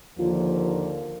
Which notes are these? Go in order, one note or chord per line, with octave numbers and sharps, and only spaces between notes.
D#2 D3 F3 A#3 F4